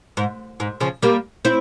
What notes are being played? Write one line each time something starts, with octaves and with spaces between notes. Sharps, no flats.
G#2
G#2
C#3 F3
G3 A#3
C4 E4